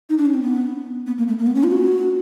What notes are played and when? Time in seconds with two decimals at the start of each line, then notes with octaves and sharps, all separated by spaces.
0.10 D#4
0.18 D4
0.26 C#4
0.34 C4
0.42 B3
1.07 B3
1.18 A#3
1.28 A3
1.39 A#3
1.47 B3
1.55 C#4
1.64 F4
1.72 F#4